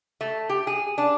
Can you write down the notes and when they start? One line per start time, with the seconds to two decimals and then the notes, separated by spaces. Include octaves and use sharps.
0.21 A3
0.49 G4
0.67 G#4
0.98 D4